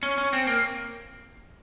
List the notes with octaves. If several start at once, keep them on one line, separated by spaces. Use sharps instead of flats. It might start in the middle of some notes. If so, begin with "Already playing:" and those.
C#4
C#4
C4
A#3